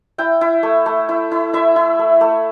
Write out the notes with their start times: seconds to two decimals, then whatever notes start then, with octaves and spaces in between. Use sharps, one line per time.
0.18 E4 G5
0.41 E4
0.63 A3
0.86 A3
1.09 E4
1.31 E4
1.53 E4 E5
1.76 E4
1.99 A3
2.21 A3